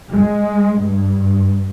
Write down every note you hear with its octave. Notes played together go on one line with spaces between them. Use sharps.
G#3
G2